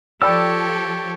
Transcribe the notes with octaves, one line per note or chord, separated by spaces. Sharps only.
F3 G4 A4 C#5 D5 G5 B5 E6